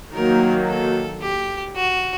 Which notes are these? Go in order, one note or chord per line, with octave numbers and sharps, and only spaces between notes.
D#3 F#3 A#3 A#4
A4
G4
F#4